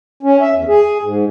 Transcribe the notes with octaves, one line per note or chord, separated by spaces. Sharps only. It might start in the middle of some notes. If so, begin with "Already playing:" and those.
C#4
E5
E2
G#4
G#2